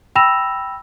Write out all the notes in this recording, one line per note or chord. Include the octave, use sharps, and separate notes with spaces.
G5 B5 E6 A#6 E7 F7